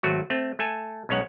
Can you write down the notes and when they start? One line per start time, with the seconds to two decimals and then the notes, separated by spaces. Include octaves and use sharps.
0.03 G#1 F#3 A3 F#4
0.30 A3 C4
0.59 A3 A4 G#5
1.09 B1 G#3 C#4 C#5 F#5